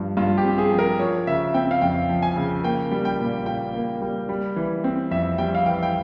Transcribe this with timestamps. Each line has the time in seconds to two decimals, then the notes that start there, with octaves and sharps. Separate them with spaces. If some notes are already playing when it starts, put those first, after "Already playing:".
Already playing: G2 F3
0.17 G2 F4
0.38 G4
0.44 C4
0.58 G#4
0.72 F3
0.79 A#4
0.99 F3 C#5
1.27 C#3 E5
1.54 C4 G5
1.71 F5
1.82 F2 G5
2.09 F3
2.22 G#5
2.37 C#3
2.64 A#3 G5
2.91 G3
3.05 G5
3.20 A#2
3.46 A#2 G5
3.74 A#3
4.01 G3
4.29 G3
4.56 E3
4.84 C4
5.11 F2 E5
5.38 G3 G5
5.55 F5
5.66 E3 G5
5.83 G5